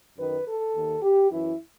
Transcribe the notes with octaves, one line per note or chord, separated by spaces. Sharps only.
F#2 D#3 B4
A4
D#2 D#3
G4
F#2 E3 E4